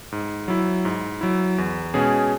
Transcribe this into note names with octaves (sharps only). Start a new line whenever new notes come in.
G#2
F#3 E4
G#2
F#3 E4
E2
B2 G#3 C#4 G#4